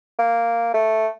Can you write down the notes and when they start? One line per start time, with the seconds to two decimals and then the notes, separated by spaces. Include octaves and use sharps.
0.19 A#3
0.74 A3